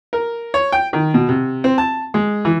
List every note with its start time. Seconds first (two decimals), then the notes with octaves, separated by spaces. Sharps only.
0.13 A#4
0.54 C#5
0.72 G5
0.93 D#3
1.14 B2
1.29 C3
1.64 C4
1.78 A5
2.14 G#3
2.45 E3